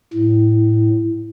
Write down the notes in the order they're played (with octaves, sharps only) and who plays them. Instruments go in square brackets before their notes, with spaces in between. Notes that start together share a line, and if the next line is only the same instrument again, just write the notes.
[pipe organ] A2